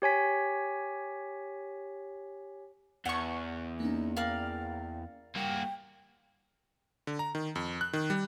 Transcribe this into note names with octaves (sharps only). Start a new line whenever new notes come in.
G4 C#5 G#5 B6
E2 B4 F#5 C#6
A#3 C#4 D#4
A#4 D5 F5 G5
G3 A#3 F#4 G5
D3
A#5
D#3
F2
F#6
D#3
G3